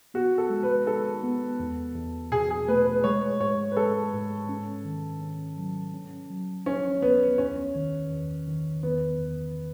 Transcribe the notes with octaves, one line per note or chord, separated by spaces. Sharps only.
B3 F#4
A4
G#3
B4
D#4 A4
B3
E2
E2
B2 G#4
G#4
A3 B4
B4
G#3 C#5
G#2 C#5
B4
G#3 A4
G#2
C#4
D#3
C#4
F#3
C#4
F#3
C#2 C#4
C#2 B3
E2 C#4
D#3
E2
D#3
E2 B3
E2